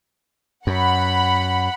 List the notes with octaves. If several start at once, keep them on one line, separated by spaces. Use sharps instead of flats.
F#2 F#5 B5